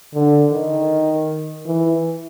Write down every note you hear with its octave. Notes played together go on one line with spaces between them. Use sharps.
D3
D#3
E3